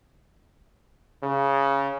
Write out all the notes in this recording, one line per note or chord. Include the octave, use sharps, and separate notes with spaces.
C#3